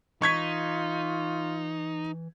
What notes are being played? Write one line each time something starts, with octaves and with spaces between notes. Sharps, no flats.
E3 D#4 F4 C#6 G#6 B6